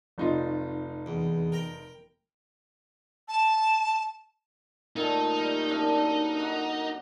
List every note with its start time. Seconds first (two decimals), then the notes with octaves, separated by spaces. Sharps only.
0.18 F1 D#4 F4
1.06 E2
1.52 A#4 G5 A#5
3.28 A5
4.96 A#2 D#3 A3 D#4
5.38 G3
5.69 F#2 D4 G4
6.40 F#4